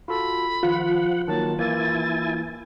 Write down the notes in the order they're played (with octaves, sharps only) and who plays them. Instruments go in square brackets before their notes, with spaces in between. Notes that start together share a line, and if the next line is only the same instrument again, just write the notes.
[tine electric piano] F4 F#4 A4 [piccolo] B5
[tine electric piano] D#3 [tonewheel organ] F3 F#5 [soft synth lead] F4
[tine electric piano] D#3 F#3 A#3 [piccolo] A5
[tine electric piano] E3 A#3 [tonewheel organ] E4 G#5 [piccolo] A6